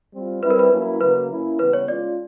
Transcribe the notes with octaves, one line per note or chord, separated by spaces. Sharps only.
G3 C4 F4
G3 C4 E4 B4
A#4
B4
F#3 A#3 C#4 E4
C#3 F#3 A#3 B4
A#3 C#4 E4
C#3 E3 G3 B3 B4
C#5
G#3 C#4 F4 D5